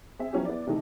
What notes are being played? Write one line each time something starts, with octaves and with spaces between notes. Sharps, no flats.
C4 G#4 E5
F3 F#3 B3 C#4 E4 G4
B3 E4 D5
C3 D#3 E3 A3 D#4